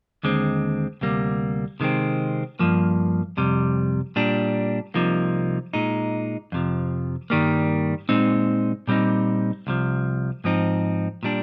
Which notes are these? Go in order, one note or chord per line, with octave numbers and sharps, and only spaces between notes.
D#2 D3 G#3 C4
D2 C3 G3 A#3
C3 D#3 G#3 C4
G2 F3 A#3
F2 C3 G3
A#2 G3 D4
C2 C3 F3 A#3 D#4
A#2 G#3 D#4
F2 C3 F3
G2 D#3 G3 A#3
A#2 G#3 C4 D#4
A#2 G3 C4 D#4
C2 C3 F3
G#2 F3 C4 D#4
A#2 G3 D4